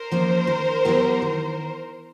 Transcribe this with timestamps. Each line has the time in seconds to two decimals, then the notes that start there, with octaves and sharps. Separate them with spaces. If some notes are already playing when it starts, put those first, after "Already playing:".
Already playing: A#4 C5
0.11 F3 A#3 C#4
0.47 D#3
0.85 F#3 B3 E4 G4
1.22 D#3